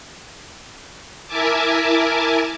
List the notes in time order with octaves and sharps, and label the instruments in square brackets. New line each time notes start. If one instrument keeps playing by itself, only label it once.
[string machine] E4 A#4 E5 G#5 A5 D6